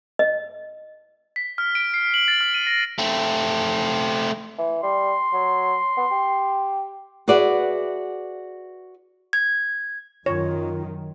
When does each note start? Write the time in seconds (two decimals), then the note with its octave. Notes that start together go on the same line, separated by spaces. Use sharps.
0.19 D#5
1.36 B6
1.58 F6
1.75 D7
1.94 C7
2.14 F#7
2.28 A6
2.41 F6
2.54 D#7
2.67 A#6
2.99 A3 C4
4.58 E3
4.83 G3 C6
5.33 F#3
5.97 B3
6.11 G4
7.28 F#4 G#4 B4 D5 E5 F#5
9.33 G#6
10.26 F#2 D#3 F4 C#5